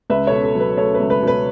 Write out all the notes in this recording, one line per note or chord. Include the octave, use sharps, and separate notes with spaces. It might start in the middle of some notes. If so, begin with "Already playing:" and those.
C#2 B4 E5
B2 A4 C#5
A4
F#3
B4
A3 A4 C#5
B4
C#2
B4
B2
B4